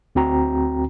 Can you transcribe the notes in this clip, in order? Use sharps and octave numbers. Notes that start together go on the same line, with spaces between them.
D2 C4 F#4 G5 A#5